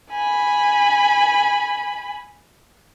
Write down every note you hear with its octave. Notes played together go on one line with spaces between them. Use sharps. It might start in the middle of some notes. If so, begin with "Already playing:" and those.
G#5 B5